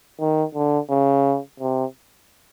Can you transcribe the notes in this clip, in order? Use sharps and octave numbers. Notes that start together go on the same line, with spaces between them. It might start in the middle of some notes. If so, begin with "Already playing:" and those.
D#3
D3
C#3
C3